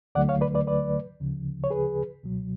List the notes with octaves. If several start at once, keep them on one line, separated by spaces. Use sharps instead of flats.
D2 D3 F#3 A3 D5 F#5
C#5 F5
B4 D5
B4 D5
B4 D5
D2 C#3 F3
C#5
G#4 B4
C#2 B2 F#3